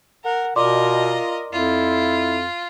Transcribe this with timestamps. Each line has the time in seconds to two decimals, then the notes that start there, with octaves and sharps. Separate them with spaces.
0.24 A#4 F#5
0.56 B2 F4 A#4 D5 D#5 C6 D6
1.53 F2 E4 F4